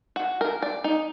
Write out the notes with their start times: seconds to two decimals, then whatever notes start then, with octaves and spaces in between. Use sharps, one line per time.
0.16 F#4
0.41 A#4
0.62 D5
0.84 D#4